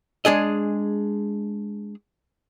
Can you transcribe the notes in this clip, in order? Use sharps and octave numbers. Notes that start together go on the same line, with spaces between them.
G#3 D4 G#4 D#5